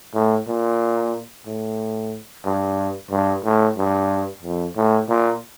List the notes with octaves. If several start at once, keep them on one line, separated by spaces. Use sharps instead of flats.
A2
A#2
A2
G2
G2
A2
G2
F2
A2
A#2